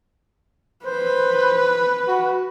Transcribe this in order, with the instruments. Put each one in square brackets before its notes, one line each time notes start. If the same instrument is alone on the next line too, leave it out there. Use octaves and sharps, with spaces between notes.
[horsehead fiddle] B4 [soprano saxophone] C5
[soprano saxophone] F#4